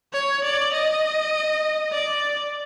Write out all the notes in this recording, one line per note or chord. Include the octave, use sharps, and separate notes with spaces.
C#5
D5
D#5
D5